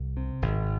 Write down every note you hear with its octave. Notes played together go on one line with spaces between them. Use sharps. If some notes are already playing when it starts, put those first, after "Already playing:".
Already playing: C2
C3
G#1